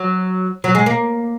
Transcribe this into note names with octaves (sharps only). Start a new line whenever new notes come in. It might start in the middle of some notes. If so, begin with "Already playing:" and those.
Already playing: F#3
F#3
G#3
A#3